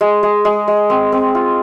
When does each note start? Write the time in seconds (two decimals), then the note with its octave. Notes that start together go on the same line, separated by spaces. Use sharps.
0.01 G#3
0.23 G#3
0.45 G#3
0.68 G#3
0.90 C4
1.12 C4
1.35 F4